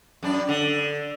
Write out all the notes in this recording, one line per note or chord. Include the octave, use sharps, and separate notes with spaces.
F#2 D4
D3